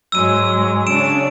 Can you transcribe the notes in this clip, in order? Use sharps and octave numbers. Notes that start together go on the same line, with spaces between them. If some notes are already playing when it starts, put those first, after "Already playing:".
G#2 F#3 G#3 E6 D#7
C#3 D4 D7 E7